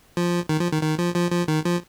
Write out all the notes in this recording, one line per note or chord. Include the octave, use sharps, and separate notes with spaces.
F3
D#3
F3
D#3
D#3
F3
F3
F3
D#3
F3